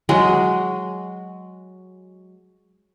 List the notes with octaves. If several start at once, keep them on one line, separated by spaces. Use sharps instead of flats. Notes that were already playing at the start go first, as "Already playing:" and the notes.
F#3 G#3